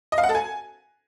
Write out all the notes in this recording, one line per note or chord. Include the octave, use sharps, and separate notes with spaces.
D#5
F5
F#5
A4
G#5